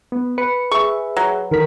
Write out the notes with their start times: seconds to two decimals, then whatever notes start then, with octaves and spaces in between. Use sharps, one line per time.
0.12 B3
0.38 B4 C#7
0.72 G#4 E5 C#6
1.17 F#3
1.51 D#3 A4 A#4 B6